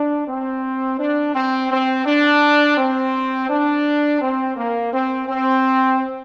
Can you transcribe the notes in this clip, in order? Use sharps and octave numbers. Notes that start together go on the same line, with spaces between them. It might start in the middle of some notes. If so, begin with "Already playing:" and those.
Already playing: D4
C4
D4
C4
C4
D4
C4
D4
C4
A#3
C4
C4